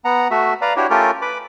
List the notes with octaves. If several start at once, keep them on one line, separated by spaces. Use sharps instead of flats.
B3 F#5 A#5
A3 F#4 E5
B4 D5 F5 A#5
D4 E4 F#4 G4 C#5
A3 C#4 F4 G4 A4 A#4
B4 B5 D6